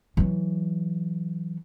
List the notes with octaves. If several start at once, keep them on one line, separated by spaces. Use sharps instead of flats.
E3 F#3